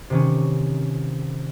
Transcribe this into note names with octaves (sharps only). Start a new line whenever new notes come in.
C3 D#3 C#4